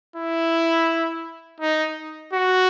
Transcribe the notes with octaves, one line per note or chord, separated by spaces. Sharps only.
E4
D#4
F#4